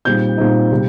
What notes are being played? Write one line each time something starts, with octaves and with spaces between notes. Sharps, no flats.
A#2 G3 C4 D#4 G6
A#2 G3 C4 D#4
C3 G3